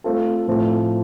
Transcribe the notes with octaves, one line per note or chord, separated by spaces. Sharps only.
A3 C4 F4 A4
A2 F3 A3 C4